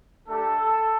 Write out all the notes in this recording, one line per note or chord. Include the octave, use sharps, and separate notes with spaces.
A3 D4 G4 A4